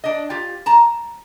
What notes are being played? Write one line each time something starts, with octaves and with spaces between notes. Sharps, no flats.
D4 D#5
F4 G4
A5 A#5